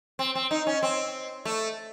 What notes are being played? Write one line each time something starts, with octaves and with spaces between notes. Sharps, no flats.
C4
C4
D#4
C#4
C4
A3